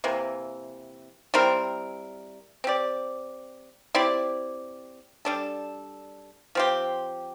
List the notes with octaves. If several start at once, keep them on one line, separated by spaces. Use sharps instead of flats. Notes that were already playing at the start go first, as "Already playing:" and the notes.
C3 E3 A#3
G3 C4 E4 A#4
C4 G4 D5
C4 E4 G4 D5
G3 D4 A4
F3 C4 G4